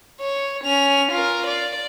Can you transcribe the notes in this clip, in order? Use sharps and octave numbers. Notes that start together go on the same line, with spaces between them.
C#5
C#4 F7
F4 A#4
D5